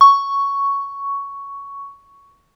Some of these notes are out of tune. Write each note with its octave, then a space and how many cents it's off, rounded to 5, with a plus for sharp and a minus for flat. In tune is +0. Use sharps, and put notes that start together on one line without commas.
C#6 +5